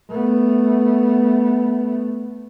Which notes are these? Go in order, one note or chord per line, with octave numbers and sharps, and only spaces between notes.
A3 B3